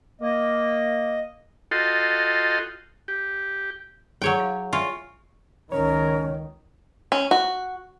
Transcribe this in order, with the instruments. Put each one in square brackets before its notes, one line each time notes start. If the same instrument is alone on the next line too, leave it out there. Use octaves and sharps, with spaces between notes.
[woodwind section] A#3 [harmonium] D#5
[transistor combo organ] F4 F#4 A4 D#5 G5 C6
G4
[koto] F#3 C#5 G5 [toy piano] E4 G#4 C#6
[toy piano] F5
[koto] F4 [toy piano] E5 G#5 C#6
[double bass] C#2 D#3 [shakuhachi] C#4 [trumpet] A#4 [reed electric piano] C#5
[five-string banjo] C#4
F#4